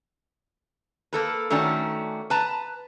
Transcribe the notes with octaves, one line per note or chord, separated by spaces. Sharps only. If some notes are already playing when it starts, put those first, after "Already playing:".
A#3 A4 B4
D#3 A3 C#4 D4 F#4
B4 A5 A#5